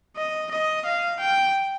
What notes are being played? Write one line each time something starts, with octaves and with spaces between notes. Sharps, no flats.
D#5
D#5
F5
G5